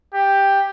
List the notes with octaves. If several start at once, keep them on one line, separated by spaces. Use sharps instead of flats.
G4